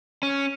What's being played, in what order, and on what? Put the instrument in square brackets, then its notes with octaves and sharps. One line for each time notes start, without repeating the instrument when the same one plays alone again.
[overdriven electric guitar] C#4